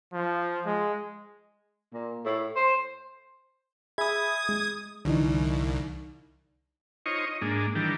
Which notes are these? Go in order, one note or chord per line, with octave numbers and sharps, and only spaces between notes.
F3
G#3
A#2
A2
C5
G#4 E5 B5 D#6 G#6
G#3
C2 D3 E3 D#4
D#4 F4 C5 C#5 D#5 C#6
D#5
G#2 G#3 A#3 D4
D#3 E3 G3 D4 G4 A#4